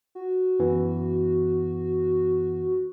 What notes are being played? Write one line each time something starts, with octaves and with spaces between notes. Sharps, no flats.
F#4
F#2 E3 B3